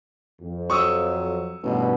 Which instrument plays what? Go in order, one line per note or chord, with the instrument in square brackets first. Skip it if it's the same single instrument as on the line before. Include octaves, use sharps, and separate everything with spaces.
[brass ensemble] F2
[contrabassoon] F#3 [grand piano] C#6 D#6 E6
[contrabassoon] A1 [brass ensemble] G2 B2